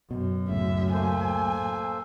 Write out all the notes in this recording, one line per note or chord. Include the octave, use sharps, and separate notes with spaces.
F#2 B2
C#2 A2 C#3 E5
A#3 A4 C5 G#5